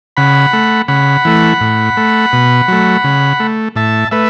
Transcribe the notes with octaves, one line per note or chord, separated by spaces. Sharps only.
C#3 F#5 B5
A3
C#3 F#5 B5
E3 A3
A2
A3
B2
F#3 A3
C#3
A3
A2 E5 A5
A3 B4 E5